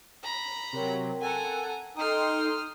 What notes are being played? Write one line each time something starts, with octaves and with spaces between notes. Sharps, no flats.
A#5 B5
C3 F#3 C4 A#4 G5
A4 F#5 G#5 A#5
D#4 A4 G5 A#5 C6 D#6 F6